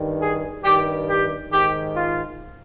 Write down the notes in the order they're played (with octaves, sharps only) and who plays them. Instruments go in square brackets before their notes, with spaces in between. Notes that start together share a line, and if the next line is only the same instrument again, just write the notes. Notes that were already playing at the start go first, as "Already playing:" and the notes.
Already playing: [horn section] G2 D#3
G#4
G2 D#3 G4
G4
G#2 D#3 G4
F4